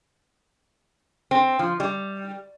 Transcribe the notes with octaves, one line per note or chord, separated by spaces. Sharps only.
C4
F3
G3